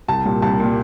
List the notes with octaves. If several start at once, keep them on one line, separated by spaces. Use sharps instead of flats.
C2 A5
A#2 G3
C2 A5
A#2 G3